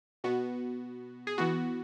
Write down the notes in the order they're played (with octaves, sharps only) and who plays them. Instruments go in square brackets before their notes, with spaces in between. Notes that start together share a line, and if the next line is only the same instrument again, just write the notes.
[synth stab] B2 B3 F#4
G#4
E3 B3 F#4